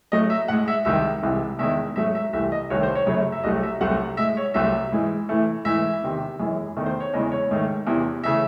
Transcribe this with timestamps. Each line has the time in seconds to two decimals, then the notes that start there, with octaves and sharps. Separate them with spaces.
0.12 A2 F#3 A3 D#5
0.30 E5
0.48 A2 G#3 F#5
0.68 E5
0.85 C2 C3 D#3 G#3 E5
1.23 C2 C3 E3 G#3
1.59 E2 D#3 G#3 E5
1.96 G#2 F#3 A3 E5
2.15 E5
2.33 C2 C3 E3 A3 E5
2.52 D#5
2.70 C2 C3 D#3 A3 C#5
2.83 C5
2.95 C#5
3.07 F#2 C#3 F#3 A3 C#5
3.32 E5
3.44 C2 C3 F#3 A3 D#5
3.63 E5
3.81 C2 C3 F#3 A3 F#5
4.17 A2 G#3 E5
4.37 C#5
4.54 C2 C3 F#3 A3 E5
4.92 G#2 E3 G#3
5.29 A2 E3 A3
5.65 G#2 E3 A3 E5
6.02 E2 C3 D#3
6.40 F#2 E3 G#3
6.77 E2 D#3 A3
6.86 C5
7.00 C#5
7.13 E2 C#3 E3 G#3 D#5
7.32 C#5
7.51 G#2 D#3 A3
7.87 E2 C3 E3
8.24 C#3 E3 A3 E5